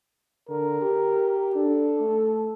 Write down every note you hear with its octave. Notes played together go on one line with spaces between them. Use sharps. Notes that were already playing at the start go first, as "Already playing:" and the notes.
D3 A#4
G4
D4 A4
A3